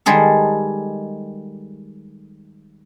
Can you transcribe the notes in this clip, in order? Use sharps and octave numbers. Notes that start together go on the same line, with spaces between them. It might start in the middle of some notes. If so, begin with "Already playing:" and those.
D#3 G3 G#3 G#4 A4